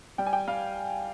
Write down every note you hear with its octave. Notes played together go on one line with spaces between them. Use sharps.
G3 G5
G#5
G5
G3 F5